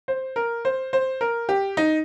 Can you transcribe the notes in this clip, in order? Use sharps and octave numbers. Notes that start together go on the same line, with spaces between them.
C5
A#4
C5
C5
A#4
G4
D#4